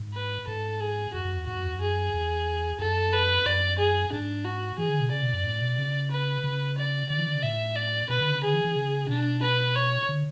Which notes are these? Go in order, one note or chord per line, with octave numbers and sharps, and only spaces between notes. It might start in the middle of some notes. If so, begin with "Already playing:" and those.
Already playing: G#2
B4
G#2 A4
G#4
F#2 F#4
F#2
E2
G#2 F#4
F#2
E2
F#2
G#4
E2
F#2 A4
B4
F#2 D5
G#4
G#2 D4
F#4
E3 G#4
D3
B2
C#3 D5
B2
F#2
A2
B2
C#3
B4
C#3
D5
D3 D5
E3
D3
C#3
A2 E5
D5
B2 B4
D3
C#3
D3 G#4
E3
E3
C#3
B2 D4
B4
C#5
D3